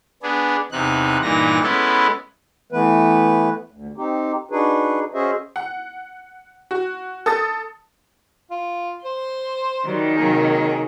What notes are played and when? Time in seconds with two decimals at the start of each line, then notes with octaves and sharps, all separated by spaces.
0.23 B3 D4 G#4
0.72 E2 C3 D#4 F#6
1.23 G2 A#2 E3 D#4 A#6
1.63 G#3 B3 C#4 E4 A4
2.72 E3 A3 B3 B4
3.72 D2
3.97 C4 D#4 G4
4.51 D4 D#4 F#4 G#4 B4
5.14 C#4 F#4 G#4 C5 D#5 E5
5.56 F#5
6.71 F#4
7.26 A4 D#6 A6
8.51 F4
9.05 C5 C6
9.85 D#3 F#3 G3
10.16 C3 F#3 A#3 G#4